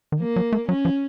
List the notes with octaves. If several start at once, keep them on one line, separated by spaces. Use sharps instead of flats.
D#3
F3 A#3
F#3
A3
F#3 C#4
F3